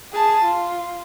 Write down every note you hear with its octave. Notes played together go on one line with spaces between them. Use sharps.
G#4 A5
F4